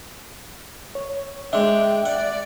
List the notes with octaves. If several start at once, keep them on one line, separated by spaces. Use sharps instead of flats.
C#5
G#3 D4 E5 G5
D5 F#5